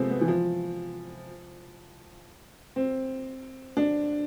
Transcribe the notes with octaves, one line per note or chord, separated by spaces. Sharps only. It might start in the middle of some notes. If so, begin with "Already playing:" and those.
Already playing: C3 F3 G#3 A3 B3 C4
B3
E3
F3
C4
D4